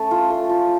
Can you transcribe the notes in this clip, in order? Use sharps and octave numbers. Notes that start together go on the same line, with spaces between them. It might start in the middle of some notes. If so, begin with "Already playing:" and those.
Already playing: A3 C#4
F4
A3
F4